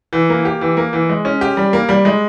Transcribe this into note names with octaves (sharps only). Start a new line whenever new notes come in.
E3
A#3
G4
E3
A#3
E3
G#3
C#4
G4
G3
A#3
G3
G#3